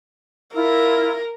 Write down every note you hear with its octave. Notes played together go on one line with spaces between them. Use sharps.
E4 F4 A#4 E6